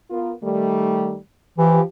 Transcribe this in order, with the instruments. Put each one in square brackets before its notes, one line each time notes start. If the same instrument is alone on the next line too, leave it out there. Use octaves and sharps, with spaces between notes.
[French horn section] B3 F4 A#4
D#3 G3 A3
[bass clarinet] E3 [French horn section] F3 G4